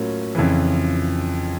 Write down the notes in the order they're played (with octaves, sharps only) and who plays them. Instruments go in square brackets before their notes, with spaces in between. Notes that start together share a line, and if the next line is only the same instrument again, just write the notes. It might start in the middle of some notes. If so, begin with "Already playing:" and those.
Already playing: [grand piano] A2 F#3 A#3 C#4 F4
F2 C#3 E3